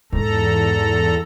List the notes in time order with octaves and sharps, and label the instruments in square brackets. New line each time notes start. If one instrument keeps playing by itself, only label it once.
[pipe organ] E2 A4 A#5 [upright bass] G#2